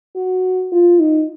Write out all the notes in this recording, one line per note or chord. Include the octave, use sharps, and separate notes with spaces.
F#4
F4
D#4